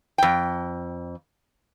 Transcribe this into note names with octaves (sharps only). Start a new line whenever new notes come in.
F2 G5